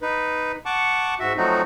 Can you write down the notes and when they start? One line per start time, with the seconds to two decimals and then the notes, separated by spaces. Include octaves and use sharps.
0.02 D#4 B4
0.66 F#5 A5 C#6 D6
1.20 G#2 F#4 E5
1.37 F3 F#3 A3 C4 D#4 F#4